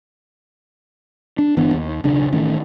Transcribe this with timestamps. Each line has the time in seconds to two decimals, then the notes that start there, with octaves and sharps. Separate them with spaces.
1.38 D4
1.57 G1 E3 B3 D4
1.74 D#2
2.04 D#1 B1 C#3 D4
2.33 A1 D#3 A3 C#4